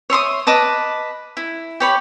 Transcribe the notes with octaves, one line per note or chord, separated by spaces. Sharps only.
C#5 E5 C6 D#6
B4 D#5 A5 D6
E4
G4 C#5 B5